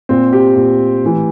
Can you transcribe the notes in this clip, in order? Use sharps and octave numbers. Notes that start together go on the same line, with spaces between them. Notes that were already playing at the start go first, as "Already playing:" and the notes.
A#2 C4
G4
A#2
A2 E3